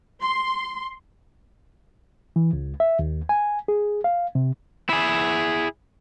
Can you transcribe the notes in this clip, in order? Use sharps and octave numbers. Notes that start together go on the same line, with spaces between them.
C6
E3
C#2
E5
D#2
G#5
G#4
F5
C3
E4 G#4